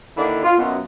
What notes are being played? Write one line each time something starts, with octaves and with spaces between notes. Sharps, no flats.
D3 D#3 A#3 D4 E4
F4
F#2 B2